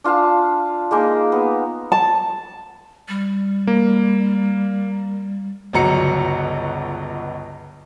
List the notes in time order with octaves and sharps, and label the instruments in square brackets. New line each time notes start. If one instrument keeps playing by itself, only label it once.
[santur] D4 F4 F5 A5
G#3 A#3 D#4
B3
[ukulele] A5
[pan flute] G3
[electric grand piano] A#3
[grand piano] G1 C#2 F#3 A#5 C#7